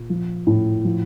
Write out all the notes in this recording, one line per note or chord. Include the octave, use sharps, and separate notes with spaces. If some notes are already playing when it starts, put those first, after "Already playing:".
Already playing: A#2
F3
A2
F3